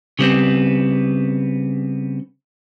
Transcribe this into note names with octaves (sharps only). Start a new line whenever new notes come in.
C#3 G3 B3 C4